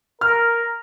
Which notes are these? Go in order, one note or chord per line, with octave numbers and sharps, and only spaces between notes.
A#4 F6